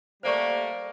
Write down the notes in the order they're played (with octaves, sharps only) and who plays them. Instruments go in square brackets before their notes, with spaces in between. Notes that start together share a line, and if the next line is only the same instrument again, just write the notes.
[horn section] G3 A3 A#3 [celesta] C5 D5 C#6